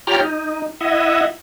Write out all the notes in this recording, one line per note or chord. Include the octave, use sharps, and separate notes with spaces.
F4 G4 C#5 G5 A#5 F6
D#4
E4 D#5 E5 F#5